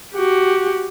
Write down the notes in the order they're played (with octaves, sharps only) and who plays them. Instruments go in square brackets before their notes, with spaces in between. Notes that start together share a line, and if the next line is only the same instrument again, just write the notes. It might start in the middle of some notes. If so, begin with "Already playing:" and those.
[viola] F#4 G4